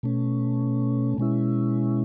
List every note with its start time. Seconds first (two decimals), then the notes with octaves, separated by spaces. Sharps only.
0.03 B2 A3 C#4
1.18 B2 G#3 C#4 E4